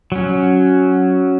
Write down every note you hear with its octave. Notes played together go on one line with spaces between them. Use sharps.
F#3 C#4